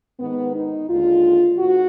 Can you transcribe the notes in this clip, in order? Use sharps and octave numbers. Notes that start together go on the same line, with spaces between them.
G#2 D#3 G#3 B3
D#4
D#2 D3 G#3 F4
G#2 F#4